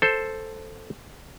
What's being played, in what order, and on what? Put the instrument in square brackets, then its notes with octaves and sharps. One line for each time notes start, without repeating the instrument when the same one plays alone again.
[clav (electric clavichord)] A4 C5